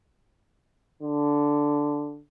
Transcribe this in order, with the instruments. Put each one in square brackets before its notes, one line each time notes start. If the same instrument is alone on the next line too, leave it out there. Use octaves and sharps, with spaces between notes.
[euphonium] D3